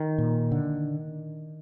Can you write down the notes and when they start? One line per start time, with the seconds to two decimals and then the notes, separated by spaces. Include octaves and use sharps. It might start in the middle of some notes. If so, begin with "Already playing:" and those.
Already playing: D#3
0.18 A#2
0.51 D3